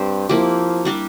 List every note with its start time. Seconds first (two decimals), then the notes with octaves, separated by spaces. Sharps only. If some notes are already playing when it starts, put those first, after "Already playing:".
Already playing: G2 C4 G4 C5
0.29 F3 A#3 E4 G4
0.85 G3 D4 G4